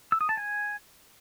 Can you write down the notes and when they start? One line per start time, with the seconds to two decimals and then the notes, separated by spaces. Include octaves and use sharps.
0.12 E6
0.21 D#6
0.29 A5
0.37 G#5